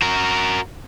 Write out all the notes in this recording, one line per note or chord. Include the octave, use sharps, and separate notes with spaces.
F#4 A#4